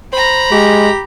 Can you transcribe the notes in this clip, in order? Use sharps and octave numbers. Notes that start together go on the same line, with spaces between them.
C5 A#5 B5
G#3 G4